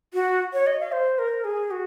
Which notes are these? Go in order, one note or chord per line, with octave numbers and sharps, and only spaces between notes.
F#4
C#5
D#5
F5
C5
A#4
G#4
F#4